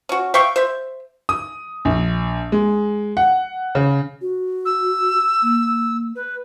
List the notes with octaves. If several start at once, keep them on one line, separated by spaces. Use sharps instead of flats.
C#4 F#4
E5 F5 G5 C#6
C5 E5
D#6
A#1
G#3
F#5
C#3
F#4
E6
A#3
B4